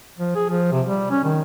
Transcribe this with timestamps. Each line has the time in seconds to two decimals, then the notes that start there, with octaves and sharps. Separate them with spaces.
0.18 F3
0.36 G#4
0.49 F3
0.72 C3
0.86 G3
1.10 C#4
1.24 D#3